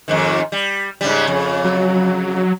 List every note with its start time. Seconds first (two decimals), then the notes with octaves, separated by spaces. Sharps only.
0.08 F2 G#2 D#3
0.52 G3
1.01 G#2 C#3 G3
1.27 F2 C#3
1.65 F#3